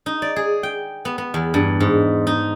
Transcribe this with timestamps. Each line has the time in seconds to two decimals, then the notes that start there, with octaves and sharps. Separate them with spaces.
0.06 D#4
0.22 D5
0.36 G#4
0.63 G5
1.05 B3
1.18 B3
1.34 E2
1.54 G2
1.80 G#2
2.27 D#4